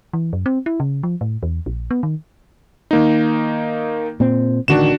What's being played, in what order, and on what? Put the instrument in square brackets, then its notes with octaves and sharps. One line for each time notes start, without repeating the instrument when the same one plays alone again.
[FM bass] E3
F#2
C4
E4
C#3
F3
A2
E2
A#1
B3
D#3
[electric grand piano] D#3 A#3 D#4
[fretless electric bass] A#2 C4
[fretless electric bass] A1 D3 D#3 [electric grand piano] D4 F#4 E7